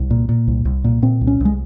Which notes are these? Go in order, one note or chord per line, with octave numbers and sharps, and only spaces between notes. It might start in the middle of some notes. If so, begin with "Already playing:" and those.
Already playing: C2
A#2
A#2
C2
C2
A#2
A#2 C4
C2
C#4
C2 G#3